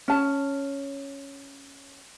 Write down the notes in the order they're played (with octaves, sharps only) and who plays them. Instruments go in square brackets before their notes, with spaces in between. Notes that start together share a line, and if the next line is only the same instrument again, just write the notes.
[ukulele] C#4 A5